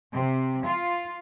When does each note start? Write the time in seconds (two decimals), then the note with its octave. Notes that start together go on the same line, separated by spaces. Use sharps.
0.13 C3
0.65 F4